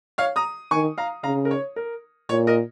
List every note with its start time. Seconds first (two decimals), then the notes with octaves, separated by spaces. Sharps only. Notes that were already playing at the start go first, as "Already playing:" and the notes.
0.18 C#5 F5
0.36 A#5 D#6
0.71 D#3 G#5 C#6
0.98 F5 A#5
1.23 C#3 F5 A#5
1.45 A#4
1.51 C#5
1.76 A#4
2.29 A#2 C#5
2.47 A#4 D#5